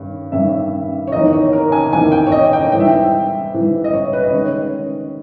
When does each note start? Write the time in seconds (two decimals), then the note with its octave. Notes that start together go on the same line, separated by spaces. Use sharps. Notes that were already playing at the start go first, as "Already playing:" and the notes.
Already playing: G2 D#3 G3 C#4
0.32 G2 D#3 G3 C#4 E5
1.07 C#5
1.12 E2 D#3 A#3 D#4 D#5
1.33 C#5
1.53 A#4
1.72 G#5
1.92 E2 D#3 A#3 D#4 G#5
2.12 G5
2.27 C#5
2.32 D#5
2.53 G5
2.72 G#2 E3 G3 G5
2.80 E5
2.87 G5
3.52 G#2 E3 G3
3.84 D#5
3.93 C#5
4.13 B4
4.24 D#5
4.32 D#3 G#3 C#4 C#5